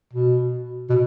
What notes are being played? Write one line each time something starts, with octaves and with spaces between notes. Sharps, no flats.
B2
B2